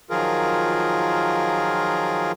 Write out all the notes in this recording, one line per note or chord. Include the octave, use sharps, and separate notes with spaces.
D#3 F3 F#3 F4 G#4 A#4